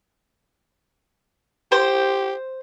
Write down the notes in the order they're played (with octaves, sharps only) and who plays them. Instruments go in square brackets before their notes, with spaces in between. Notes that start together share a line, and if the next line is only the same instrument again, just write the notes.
[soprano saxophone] G4 [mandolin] C5